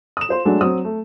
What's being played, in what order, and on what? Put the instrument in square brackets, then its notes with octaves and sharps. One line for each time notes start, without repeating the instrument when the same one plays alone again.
[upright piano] D#6 E7
F4 C5 C6
F#3 G#3 A3 D4
F#3 C4 D#6
A3